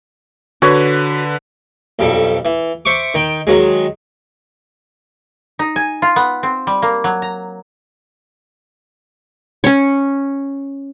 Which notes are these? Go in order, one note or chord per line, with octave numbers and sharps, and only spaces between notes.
D3 F#4 B4 C#5
B1 F2 G3 A4
E3
C5 E5 C#6 D6
D#3 G5
D#3 F#3 G#3
D#4
G#5
F4
B3
C4
G3
A#3
F#3
A#5
C#4 C#5